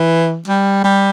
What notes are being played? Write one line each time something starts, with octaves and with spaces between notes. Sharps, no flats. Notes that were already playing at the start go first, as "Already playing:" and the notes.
Already playing: E3
G3
G3